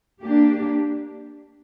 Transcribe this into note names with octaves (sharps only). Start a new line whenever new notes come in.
A#3 D4 G4